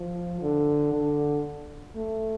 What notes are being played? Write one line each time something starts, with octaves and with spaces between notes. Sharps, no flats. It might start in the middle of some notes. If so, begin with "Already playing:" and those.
Already playing: F3
D3
D3
A3